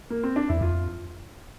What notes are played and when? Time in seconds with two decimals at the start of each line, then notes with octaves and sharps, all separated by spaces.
0.10 A#3
0.23 C4
0.36 D4
0.49 E2 E4
0.61 F2 F4